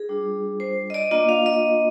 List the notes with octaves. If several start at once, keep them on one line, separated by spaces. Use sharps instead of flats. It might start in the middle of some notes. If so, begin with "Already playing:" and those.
Already playing: G#4
G3 D4 F4
C5
D#5
D5
A#3 D4 F4 D#5
F5
D#5